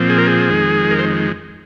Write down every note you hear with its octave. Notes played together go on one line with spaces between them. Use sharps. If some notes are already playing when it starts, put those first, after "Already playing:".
Already playing: A#2 F3 C4
G#4
A#4
G#4
F2 D#3 G#3
A#4
C5